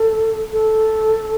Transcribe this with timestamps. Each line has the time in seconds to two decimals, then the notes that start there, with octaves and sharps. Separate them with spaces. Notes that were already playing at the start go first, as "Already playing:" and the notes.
Already playing: A4
0.53 A4